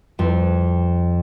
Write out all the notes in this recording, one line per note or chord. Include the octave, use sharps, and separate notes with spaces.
F2